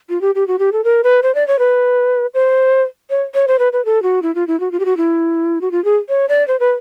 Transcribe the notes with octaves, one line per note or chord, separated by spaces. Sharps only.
F4
G4
G4
F#4
G4
A4
A#4
B4
C5
D5
C#5
B4
C5
C#5
C#5
C5
B4
B4
A4
F#4
E4
F4
E4
F#4
F4
G4
F#4
E4
F#4
F4
G#4
C#5
D5
C5
B4